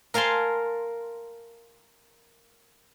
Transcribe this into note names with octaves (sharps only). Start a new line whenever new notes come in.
A#4 F5 G#5 A5 C6